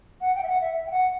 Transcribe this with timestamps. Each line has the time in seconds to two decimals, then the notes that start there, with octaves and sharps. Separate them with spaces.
0.21 F#5
0.35 G5
0.43 E5
0.48 F#5
0.61 E5
0.74 E5
0.86 G5
0.91 F#5